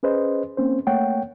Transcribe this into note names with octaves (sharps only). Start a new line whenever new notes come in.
C#4 G#4 B4 C5 D#5
A#3 C4 C#4 C5
A3 A#3 C#5 F#5 G5